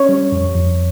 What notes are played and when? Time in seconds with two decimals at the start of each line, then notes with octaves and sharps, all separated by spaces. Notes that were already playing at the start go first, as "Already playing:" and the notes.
Already playing: C#4 C#5
0.09 G3
0.32 F2
0.54 F2